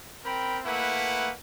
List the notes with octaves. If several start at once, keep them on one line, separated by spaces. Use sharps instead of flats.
C4 A#4 G5 B5
A3 A#3 E4 B4 F#5